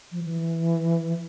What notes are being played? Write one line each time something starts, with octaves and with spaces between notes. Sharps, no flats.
F3
E3